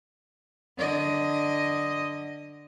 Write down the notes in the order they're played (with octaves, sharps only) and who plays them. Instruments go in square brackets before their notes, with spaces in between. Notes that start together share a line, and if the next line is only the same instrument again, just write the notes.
[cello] D3 D#5